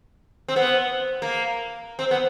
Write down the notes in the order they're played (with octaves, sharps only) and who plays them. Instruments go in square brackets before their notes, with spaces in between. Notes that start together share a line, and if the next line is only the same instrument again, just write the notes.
[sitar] C4
B3
A#3
C4
B3